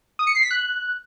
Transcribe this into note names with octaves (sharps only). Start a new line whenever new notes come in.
D#6
C#7
C7
B6
F#6